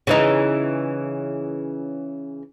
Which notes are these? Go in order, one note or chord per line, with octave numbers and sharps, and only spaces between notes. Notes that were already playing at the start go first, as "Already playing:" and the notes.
C#3 E3 D#4